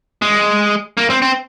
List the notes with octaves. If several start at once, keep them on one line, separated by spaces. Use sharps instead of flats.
G#3
A#3
C4
C4